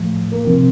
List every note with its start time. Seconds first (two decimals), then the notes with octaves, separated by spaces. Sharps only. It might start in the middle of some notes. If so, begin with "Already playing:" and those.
Already playing: A2 F3
0.32 A#3
0.44 C3 F3 C4